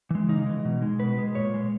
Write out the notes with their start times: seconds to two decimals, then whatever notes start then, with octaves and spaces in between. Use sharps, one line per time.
0.11 E3 G#3
0.28 C#3 D#4
0.46 E3 G#3
0.65 B2
0.82 G#3
1.00 B2 B4
1.18 G#3
1.35 A#2 C#5
1.54 G#3